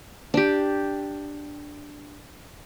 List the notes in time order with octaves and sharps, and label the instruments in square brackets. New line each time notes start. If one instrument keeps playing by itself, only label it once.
[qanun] D4 G4